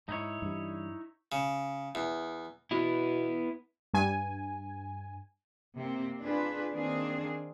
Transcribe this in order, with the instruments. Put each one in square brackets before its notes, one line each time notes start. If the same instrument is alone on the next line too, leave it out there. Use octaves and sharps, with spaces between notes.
[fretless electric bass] G#2 [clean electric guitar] D#4 E4 C#5
[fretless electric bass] G2 E3 G3
[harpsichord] C#3
E2
[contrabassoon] B2 [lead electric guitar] B3 E4
[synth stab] G2 G#5
[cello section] C3 A#3 C4
D4 F4 G#4 B4
D#3 A#3 C4 D4 G#4